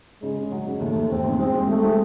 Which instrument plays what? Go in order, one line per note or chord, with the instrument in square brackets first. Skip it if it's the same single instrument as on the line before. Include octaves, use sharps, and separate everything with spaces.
[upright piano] C#3 [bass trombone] G#3
[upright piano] C#3
F#3
C#3
[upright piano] D#2 [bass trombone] A3
[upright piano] D#2
[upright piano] E1 [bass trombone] C4
[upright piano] D#2
[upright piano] G#3 [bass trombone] C4
[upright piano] G#3
[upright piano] G#3 [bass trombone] A3
[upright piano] G#3